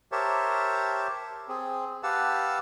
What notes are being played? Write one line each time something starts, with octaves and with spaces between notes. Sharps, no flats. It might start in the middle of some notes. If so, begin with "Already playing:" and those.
G4 A#4 C5 C#5 E5 A5
C4 G#4
G4 B4 F5 F#5 A5 E6